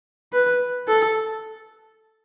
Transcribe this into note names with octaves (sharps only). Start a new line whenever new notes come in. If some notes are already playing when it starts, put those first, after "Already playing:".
B4
A4